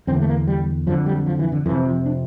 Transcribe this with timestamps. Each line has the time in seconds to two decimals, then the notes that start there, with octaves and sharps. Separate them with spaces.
0.07 E2 D3 C4
0.15 A#3
0.22 A3
0.29 A#3
0.47 G3
0.87 F2 D3 F3
1.06 G3
1.26 F3
1.39 E3
1.52 D3
1.66 F2 E3
1.71 C3
1.85 F3
2.06 D4